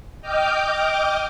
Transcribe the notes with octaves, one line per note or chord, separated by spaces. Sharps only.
D#5 G5 D6 F6 G6